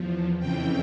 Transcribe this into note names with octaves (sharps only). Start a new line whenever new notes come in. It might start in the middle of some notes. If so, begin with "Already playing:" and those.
Already playing: E2 F3
F2 C#3 E3 G5